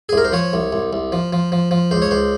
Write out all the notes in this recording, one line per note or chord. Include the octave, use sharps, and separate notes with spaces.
G#4
C2 A#4
C5
F3 C#5
C2
C2
C2
F3
F3
F3
F3
C#2 C5
C#5
C#2 C5